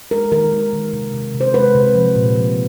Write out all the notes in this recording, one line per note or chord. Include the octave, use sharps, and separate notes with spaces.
G#3 A#4
D#3 A#4
G#3
D#3
C3
C3
C3
C5
G#3 B4
C3
F3
A#2
F3